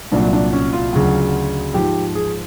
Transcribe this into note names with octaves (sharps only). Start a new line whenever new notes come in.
C2 A#2 F#3 D4
D4
C#4
F4
D2 C#3 F#3
G#2 F3 G4
G#4